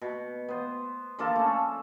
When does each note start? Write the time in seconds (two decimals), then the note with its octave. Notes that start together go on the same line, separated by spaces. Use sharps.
0.02 B2
0.49 B3 C5
1.19 D3 F3 A#3 A4
1.36 A3 C#4